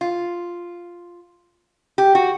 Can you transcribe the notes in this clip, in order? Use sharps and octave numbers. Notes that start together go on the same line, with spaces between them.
F4
G4
F#4